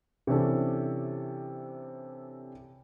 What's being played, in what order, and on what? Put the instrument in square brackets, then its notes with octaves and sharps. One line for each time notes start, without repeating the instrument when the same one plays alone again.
[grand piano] C3 E3 C#4 D4 A4